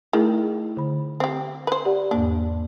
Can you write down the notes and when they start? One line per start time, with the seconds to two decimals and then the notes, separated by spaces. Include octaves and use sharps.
0.13 D#3 A3 E4 G#4
0.77 D3 B5
1.20 C4 G4
1.67 B4 C5
1.85 G4 D5 F#5
2.11 E2 G#2 A#3 D4